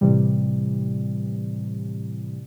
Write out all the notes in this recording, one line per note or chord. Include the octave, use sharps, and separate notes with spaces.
A2 C3 E3 G3